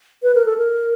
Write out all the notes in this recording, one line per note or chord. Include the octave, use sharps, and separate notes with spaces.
B4
A#4
A4
A#4